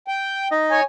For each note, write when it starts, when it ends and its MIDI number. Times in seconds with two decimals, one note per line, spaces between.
0.08 0.48 79
0.51 0.81 63
0.51 0.81 75
0.71 0.83 73
0.71 0.83 80